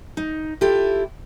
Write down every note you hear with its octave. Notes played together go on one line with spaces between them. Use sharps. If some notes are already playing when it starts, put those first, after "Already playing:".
D#4
E4 F4 G4 A4